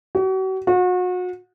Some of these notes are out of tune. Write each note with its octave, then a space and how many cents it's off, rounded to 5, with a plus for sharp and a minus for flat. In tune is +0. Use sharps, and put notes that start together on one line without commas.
F#4 +40
F#4 -35